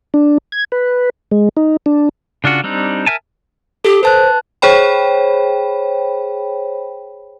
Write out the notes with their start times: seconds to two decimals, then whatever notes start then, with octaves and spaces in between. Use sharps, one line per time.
0.14 D4
0.52 G#6
0.72 B4
1.31 G#3
1.57 D#4
1.86 D4
2.44 C#3 D4 F4 F#4
2.64 G3 C4 D4 D#4
3.06 A#4 B4 E5 G#5 A5
3.85 G4 A4
4.03 B4 C5 A5 F#6
4.62 G#4 C5 C#5 G5 B5